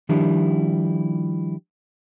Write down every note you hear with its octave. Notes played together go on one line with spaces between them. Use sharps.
D#3 F3 G3 D4 E4 G4